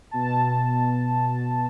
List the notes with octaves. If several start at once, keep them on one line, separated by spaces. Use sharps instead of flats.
B2 A5